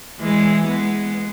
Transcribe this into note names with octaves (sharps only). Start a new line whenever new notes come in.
E3 G#3
G#3 B3